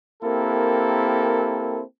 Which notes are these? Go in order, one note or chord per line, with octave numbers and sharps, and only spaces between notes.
A#3 C4 E4 G4 A4 A#4